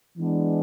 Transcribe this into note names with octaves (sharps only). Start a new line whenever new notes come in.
E3 G#3 B3 D4